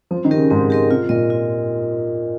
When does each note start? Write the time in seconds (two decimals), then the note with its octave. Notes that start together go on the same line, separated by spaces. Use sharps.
0.11 F3 C4
0.25 D#3
0.31 G4 A#4 D#5
0.37 C#3
0.50 G#2 C4
0.70 G4 A#4 D#5
0.90 C3 F4
1.09 A#2 A#4 D#5
1.30 F4